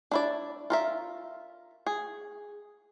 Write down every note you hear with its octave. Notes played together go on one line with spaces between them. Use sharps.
D4 E4 D5
F4 A#4 E5
G#4